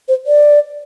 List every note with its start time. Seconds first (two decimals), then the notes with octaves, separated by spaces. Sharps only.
0.08 C5
0.27 D5